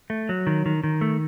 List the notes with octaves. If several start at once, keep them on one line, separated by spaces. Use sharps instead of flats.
A3
F#3
D#3
D#3
D#3
A3